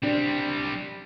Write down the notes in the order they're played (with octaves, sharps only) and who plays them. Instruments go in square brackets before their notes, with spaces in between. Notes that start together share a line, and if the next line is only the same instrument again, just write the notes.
[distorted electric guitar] G3 C4 [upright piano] D4